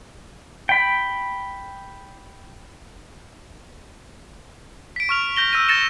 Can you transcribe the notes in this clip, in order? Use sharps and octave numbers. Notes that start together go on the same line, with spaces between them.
G5 B5
B6 D7
C#6 F6 F7
C#6 G6 A#6 G7
E6 G6 A#6 D#7
A6 A#6 C#7 E7